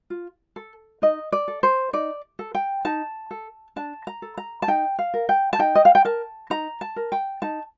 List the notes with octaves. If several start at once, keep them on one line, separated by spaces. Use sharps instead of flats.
F4
A4
D#4 D#5
D5
A4
C5
D#4 D5
A4
G5
D#4 A5
A4
D4 A5
A#5
A4
A#5
A5
D#4 G5
F5
A#4
G5
A5
D#4 G5
D#5
F5
G5
A#4 A5
D#4 A#5
A5
A#4
G5
D#4 A5